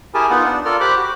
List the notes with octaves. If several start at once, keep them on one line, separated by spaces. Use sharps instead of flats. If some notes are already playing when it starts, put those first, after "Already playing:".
E4 G4 G#4 A#4 G#5 A5
B3 D#4 F4 F#5
D4 D5
F4 A4 A#4 D5 F6
G4 C5 B5 D6 F#6
F#4